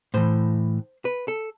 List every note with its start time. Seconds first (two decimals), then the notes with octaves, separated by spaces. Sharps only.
0.14 A2 E3 C5
1.05 B4
1.28 A4